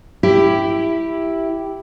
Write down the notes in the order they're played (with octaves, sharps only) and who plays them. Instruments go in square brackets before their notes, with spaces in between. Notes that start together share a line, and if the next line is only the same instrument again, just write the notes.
[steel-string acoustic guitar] E4 G4